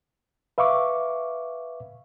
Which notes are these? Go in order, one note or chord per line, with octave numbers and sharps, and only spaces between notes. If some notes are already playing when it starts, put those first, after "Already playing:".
B4 E5 F5 C#6 D6